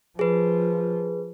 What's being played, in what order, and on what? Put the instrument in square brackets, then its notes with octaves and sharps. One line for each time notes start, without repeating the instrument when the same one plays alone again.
[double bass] F3 [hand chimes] G#4 B4